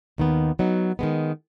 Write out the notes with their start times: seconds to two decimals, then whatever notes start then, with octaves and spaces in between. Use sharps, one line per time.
0.18 D#2 D#3 B3
0.59 F#3 B3 D#4
0.99 D#3 G#3 B3